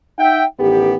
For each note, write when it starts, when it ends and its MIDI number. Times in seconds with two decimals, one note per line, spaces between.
0.18 0.43 63
0.18 0.43 76
0.18 0.43 78
0.18 0.43 79
0.59 0.95 33
0.59 0.95 51
0.59 0.95 59
0.59 0.95 67